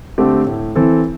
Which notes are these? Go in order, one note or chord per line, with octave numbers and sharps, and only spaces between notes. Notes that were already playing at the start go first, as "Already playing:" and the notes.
D3 A3 C4 G4
A2
E3 C4 A4